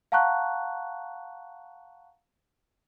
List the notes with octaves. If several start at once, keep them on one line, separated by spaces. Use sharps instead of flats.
F5 F#5 A5 A#5 C#6 F#6